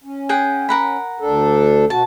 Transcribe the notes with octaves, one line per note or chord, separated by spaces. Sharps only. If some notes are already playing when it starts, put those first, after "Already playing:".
C#4
G#4 F#5 G5
A#4 F#5 B5
D2 D4 A4
B2 F#4 A5